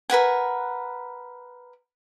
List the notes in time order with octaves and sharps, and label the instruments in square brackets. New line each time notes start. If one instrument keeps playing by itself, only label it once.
[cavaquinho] A#4 B4 F#5 G#5